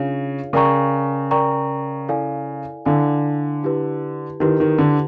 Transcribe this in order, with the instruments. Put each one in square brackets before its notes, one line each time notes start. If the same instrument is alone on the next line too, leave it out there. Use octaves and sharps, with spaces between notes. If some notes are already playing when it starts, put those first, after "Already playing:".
Already playing: [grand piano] C#3 [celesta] D4 F4 G#4 C#5 F5
[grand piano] C#3 [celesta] A#4 D5 G5 A#5 C#6
[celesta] A#4 D5 G5 A#5 C#6
E4 A4 D5 F5 G#5
[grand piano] D3 [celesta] E4 A4 D5 F5 G#5
[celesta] E4 G4 B4
[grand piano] D#3 [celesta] E4 G4 B4
[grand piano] D#3
D3